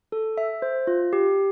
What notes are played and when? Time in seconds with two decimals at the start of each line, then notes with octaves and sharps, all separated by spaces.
0.12 A4
0.37 E5
0.62 C5
0.87 F4
1.13 G4